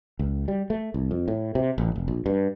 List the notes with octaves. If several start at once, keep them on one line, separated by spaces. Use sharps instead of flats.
C#2
G3
A3
C2
F2
A2
C3
A1
F1
A#1
G2